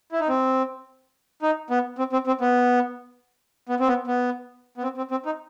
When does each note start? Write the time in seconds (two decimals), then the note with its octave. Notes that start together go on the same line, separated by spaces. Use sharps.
0.12 E4
0.20 D#4
0.28 C4
1.42 D#4
1.70 B3
1.98 C4
2.13 C4
2.27 C4
2.41 B3
3.69 B3
3.80 C4
3.88 B3
4.07 B3
4.77 B3
4.83 C4
4.97 C4
5.11 C4
5.26 D#4